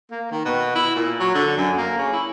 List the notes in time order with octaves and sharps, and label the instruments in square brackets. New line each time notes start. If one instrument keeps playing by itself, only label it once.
[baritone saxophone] A#3
D#3
B2
E4
A#2
F#3
D3
F#2
A#3
C#3
E4